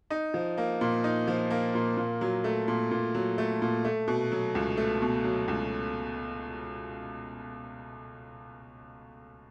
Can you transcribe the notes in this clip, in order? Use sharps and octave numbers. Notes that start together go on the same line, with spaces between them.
D#4
F3
A#3
A#2
D#4
F3
A#3
A#2
A#2
F#3
A3
A#2
A#2
F#3
A3
A#2
A3
B2
F#3
C#2
A3
B2
F#3
C#2